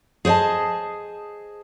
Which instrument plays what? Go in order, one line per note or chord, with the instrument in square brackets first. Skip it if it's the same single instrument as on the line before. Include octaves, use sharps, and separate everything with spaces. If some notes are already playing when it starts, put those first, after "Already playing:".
[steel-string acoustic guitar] G#4 C5 C#5 D#5 A5